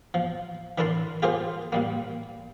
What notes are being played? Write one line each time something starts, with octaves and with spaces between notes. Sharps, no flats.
F3
E3 D4 E4 A#4 A5 C6
F4 G4 G#4 A#4 C5
A#2 G3 A#3